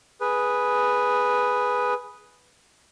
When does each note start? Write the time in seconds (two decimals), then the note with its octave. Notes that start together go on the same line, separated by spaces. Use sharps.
0.21 G#4 B4